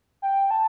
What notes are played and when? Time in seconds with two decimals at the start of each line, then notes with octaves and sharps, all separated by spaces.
0.22 G5
0.51 A5